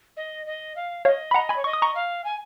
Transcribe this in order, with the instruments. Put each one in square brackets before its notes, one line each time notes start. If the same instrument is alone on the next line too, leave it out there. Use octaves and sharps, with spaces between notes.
[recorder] D#5
D#5
F5
[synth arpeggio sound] C#5 F5 [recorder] D#5
[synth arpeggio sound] B5
[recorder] D#5 [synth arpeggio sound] F#5 A#5
[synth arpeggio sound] G#5 B5
[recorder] C#5
[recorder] D#5 [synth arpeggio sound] C#6
[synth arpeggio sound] D#6
A#5 C#6
[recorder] F5
G#5